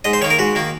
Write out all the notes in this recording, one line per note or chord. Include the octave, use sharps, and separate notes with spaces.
G#2 D#5
C5
D#3 A#3 C#5
A#4
G#2 F#4
D#3 A#3